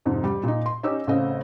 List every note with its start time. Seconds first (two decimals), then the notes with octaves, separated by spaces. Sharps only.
0.05 F2 G#2 C3
0.24 G3
0.43 A#2 D#4
0.66 C6
0.83 C#4 D#4 G4 E6
1.07 A1 C#3 A3 C4 D#5 F5